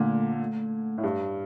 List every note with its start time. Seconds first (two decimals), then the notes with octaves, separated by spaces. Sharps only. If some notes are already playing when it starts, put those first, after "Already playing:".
Already playing: A#2 D3 A3
0.40 A3
0.98 A2
1.04 G2